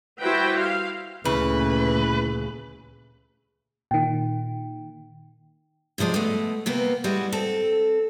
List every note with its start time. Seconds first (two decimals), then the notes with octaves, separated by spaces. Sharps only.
0.20 G3 E4 F#4 B4 C5 G5
0.59 F5
1.25 D2 A#2 C#3 E3 B4
3.91 A#2 D#3 G5
5.98 A2 C3 F3 G#3 D5
6.14 B2 G#3 A3
6.66 C3 A#3 B3
7.04 G3 G#3 E4 F#4
7.32 C4 A4